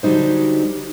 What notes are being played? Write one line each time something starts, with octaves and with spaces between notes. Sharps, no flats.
D3 F#3 G3 D#4 C5